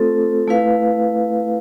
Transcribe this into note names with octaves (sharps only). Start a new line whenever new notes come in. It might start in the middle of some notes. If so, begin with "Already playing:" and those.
Already playing: A3 C4 F4 A4 C5
A3 E4 B4 F5